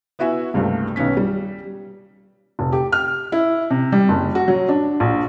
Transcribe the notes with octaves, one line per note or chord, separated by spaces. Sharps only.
B3 E4 F#4 E5 G#5
C#2 G2 C3 A3 A#3
B1 D#3 B3 C#4 B6
G3
F1
G4
F6
E4
C3
G3
F#1
F#4
F#3
D4
A#1